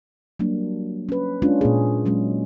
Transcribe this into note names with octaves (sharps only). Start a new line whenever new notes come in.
F#3 G3 A#3 D4
C#4 B4
G#3 C#4 D4 F4
A#2 A#3 G#4
F#3 G#3 C#4